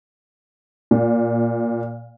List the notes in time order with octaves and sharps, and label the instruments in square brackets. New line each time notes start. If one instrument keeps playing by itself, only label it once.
[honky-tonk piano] A#2